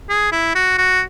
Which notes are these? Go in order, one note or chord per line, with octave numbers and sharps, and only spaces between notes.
G#4
E4
F#4
F#4